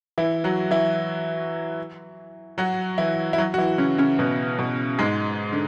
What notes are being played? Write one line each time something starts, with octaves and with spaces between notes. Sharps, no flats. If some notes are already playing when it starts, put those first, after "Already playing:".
E3 E4
F#3 F#4
E3 E4
F#3 F#4
E3 E4
E4
F#3 F#4
F#4
E3 E4
C#3 C#4
C#3 C#4
B2 B3
B2 B3
G#2 G#3
D3